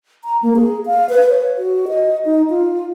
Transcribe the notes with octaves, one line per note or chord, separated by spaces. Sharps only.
A#5
A#3
G#4
F5
B4
C#5
F#4
D#5
D#4
F4